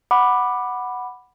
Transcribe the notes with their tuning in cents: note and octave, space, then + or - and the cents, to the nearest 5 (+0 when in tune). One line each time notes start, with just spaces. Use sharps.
F#5 +0 B5 +0 D6 +15